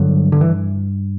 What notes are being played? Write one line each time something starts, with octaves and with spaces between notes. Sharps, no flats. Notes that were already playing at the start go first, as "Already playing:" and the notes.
Already playing: G2 D3 F#3
D3
E3